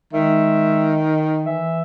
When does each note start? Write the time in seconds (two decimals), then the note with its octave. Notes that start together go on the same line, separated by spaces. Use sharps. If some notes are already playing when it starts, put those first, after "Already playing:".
0.13 D#3 G#3 E5
1.45 E3 E5